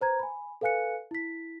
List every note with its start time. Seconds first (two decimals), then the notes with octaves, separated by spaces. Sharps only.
0.01 B4 C5 A#5 G#6
0.19 G#5 B5
0.61 A4 B4 F5 G#5 F#6 C#7
1.11 E4 B6